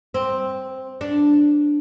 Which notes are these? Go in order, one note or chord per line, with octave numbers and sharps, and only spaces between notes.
C4
D4